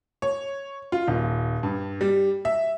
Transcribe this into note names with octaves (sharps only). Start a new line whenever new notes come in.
C#5
F4
D#1
G2
G3
E5